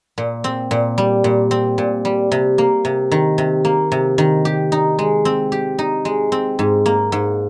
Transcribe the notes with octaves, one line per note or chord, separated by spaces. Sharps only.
A#2
C4
A#2
G3
A#2
C4
A#2
G3
C3
A#3
C3
D#3
C3
A#3
C3
D#3
G4
D#4
G#3
C4
G4
D#4
G#3
C4
G#2
A#3
G#2